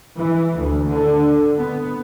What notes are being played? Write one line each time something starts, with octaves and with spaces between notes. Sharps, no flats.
E3
D2
D3
B3